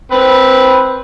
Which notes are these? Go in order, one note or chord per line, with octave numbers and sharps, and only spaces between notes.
C4 B4